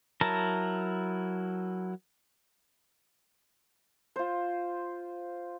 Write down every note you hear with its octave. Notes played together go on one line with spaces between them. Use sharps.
F#3 E4 A#4 A5 A#5
F4 C5